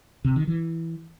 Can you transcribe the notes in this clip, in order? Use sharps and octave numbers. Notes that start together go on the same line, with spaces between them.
C3
D#3
E3